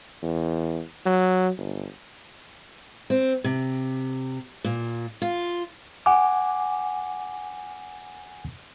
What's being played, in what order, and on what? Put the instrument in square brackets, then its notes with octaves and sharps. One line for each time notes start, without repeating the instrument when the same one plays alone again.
[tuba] E2
F#3
G1
[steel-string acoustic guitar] C4
C3
A#2
F4
[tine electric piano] F#5 G#5 D6